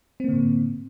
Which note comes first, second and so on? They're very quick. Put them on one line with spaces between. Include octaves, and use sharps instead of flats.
C4 A#3 D3 A2